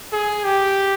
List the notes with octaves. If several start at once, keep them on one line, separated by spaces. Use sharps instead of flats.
G#4
G4